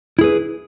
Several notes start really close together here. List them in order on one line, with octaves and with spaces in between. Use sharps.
E4 G#4 B4